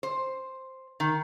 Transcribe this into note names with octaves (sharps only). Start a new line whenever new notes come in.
C5
D#3